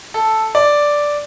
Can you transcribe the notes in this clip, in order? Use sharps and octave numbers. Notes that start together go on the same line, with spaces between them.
A4
D5